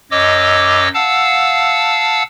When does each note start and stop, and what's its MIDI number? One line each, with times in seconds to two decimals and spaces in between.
0.11 0.88 42
0.11 0.88 73
0.11 0.88 75
0.11 0.88 86
0.11 0.88 88
0.94 2.23 77
0.94 2.23 78
0.94 2.23 81
0.94 2.23 88